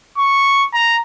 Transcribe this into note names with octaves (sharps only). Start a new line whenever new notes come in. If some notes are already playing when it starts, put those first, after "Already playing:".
C#6
A#5